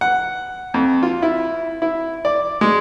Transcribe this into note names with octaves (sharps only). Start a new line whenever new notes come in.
F#5
F2
F4
E4
E4
D5
G#3